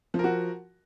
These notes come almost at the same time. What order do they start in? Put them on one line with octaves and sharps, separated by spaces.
F3 A#4 F#4